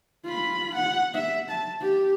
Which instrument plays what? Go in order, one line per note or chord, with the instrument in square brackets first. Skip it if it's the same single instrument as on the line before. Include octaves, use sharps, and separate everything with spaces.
[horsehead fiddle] F4 B5
F#5
E5
A5
G4